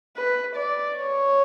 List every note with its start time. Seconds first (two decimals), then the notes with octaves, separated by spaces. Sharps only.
0.16 B4
0.56 D5
0.97 C#5